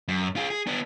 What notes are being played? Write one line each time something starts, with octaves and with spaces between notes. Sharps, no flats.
F#2
F4 G#4
G#4
B3 D4